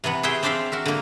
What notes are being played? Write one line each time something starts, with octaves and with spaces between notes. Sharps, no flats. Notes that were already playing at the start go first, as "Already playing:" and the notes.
C3 E3 B3 F#5
G#4 C5 C#5 E5 F#5 G5
C4 D4 C5 D5 E5 F5
F#4 A#4 E5
D3 A#3